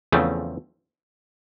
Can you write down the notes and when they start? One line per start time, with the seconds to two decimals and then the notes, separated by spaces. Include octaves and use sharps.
0.12 E2 C#3 F3 A3 C4